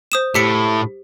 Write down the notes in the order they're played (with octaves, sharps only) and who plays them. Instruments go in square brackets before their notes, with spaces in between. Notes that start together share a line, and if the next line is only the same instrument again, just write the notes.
[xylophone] C5 D#6 E7
[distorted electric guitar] A2 [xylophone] G4 B6 C#7